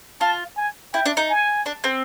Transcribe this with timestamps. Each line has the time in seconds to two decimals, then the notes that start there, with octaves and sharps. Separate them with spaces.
0.21 F4 A5
0.57 G#5
0.94 E4 G5
1.06 D4
1.17 D#4
1.30 G#5
1.66 D4
1.84 C4